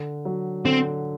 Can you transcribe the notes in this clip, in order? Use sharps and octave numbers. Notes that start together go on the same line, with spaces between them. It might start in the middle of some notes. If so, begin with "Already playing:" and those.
Already playing: D3
F#3
D3 C4